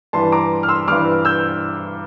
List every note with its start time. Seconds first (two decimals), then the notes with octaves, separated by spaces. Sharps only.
0.13 G2 E3 G3 A5 C6
0.32 A#5 D6
0.63 F6
0.69 C6 E6
0.87 G2 E3 G3 D6 F6
1.25 E6 G6